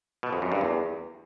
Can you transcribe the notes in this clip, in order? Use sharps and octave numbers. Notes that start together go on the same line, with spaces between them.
B2
F2
F#2
G2
E2